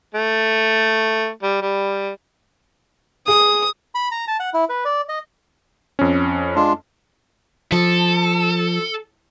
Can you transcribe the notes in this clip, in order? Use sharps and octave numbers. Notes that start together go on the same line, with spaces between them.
A3
G3
G3
G#4 D#6
B5
A#5
A5
F#5
E4
B4
D5
D#5
F2 C#4
G#3 D4 F4
F3 A4